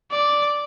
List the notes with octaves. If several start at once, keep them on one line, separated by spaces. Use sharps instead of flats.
D5